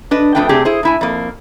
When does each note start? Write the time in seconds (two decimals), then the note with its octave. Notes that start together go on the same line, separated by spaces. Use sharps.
0.11 D4 B4 D#5
0.35 F2 A3 D4 B4 G5
0.49 C3 A3 C4 D4 G4 G#4
0.65 E4 G#4 C5
0.83 A2 E4 G#5
1.01 F2 A#3